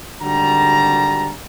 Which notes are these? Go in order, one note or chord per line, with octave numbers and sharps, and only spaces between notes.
G#1 D3 G3 F#4 A5 A#5